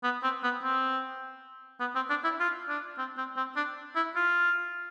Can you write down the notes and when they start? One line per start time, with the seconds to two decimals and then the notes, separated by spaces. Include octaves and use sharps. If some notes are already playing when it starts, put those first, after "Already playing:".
0.04 B3
0.23 C4
0.44 B3
0.64 C4
1.80 B3
1.96 C4
2.10 D4
2.24 E4
2.40 F4
2.69 D4
2.98 C4
3.18 C4
3.37 C4
3.57 D4
3.96 E4
4.16 F4